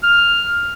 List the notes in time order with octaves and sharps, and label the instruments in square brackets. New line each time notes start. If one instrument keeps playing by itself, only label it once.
[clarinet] F6